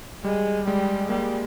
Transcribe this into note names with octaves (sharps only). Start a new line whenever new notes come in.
G3 G#3
G3 G#3
G3 A#3